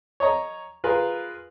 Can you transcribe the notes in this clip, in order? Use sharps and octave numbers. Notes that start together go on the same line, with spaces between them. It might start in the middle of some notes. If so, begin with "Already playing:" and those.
C#5 D#5 A#5
F4 G#4 A#4 B4